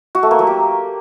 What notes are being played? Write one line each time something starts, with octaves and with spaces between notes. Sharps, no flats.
F#4
A3
A#3
F#3
G4